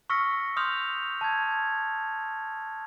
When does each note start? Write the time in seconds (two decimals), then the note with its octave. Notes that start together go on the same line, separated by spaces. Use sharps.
0.10 C#6 E6 F6 A#6 B6 C#7
0.57 C6 D#6 F6 G6 F7
1.21 A5 G#6